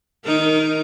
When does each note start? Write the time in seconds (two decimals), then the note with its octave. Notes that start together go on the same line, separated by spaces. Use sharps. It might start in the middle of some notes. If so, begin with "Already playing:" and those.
0.24 D#3 D#4 A#4